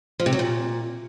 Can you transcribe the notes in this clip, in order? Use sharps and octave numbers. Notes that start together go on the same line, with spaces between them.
F3
C3
F#3
A#2